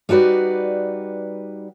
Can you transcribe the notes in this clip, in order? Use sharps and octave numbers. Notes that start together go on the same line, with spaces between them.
G3 D#4 F#4 B4 D5